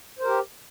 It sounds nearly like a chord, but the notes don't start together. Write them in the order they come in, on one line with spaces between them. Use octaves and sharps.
C5 A#4 G4